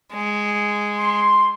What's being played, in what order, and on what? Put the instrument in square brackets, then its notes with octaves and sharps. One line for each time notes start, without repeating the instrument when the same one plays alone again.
[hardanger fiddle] G#3
[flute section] C6